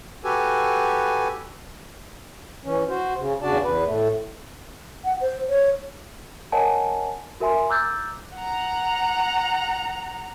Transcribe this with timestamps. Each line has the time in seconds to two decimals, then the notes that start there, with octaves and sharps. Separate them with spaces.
0.24 F#4 G4 A4 B4 G#5
2.64 E3 C#4
2.88 F#4 C5
3.18 C#3
3.42 E2 C#3 D4 F#4 D5 A5
3.64 E2 B4
3.86 A2 A3
5.05 F#5
5.21 C5
5.49 C#5
6.52 A#4 C#5 D#5 F#5 G#5 A5
7.40 F#4 A#4 E5 G#5 C6
7.69 A#5 D6 E6 F#6 G6 A6
8.36 F#5 A#5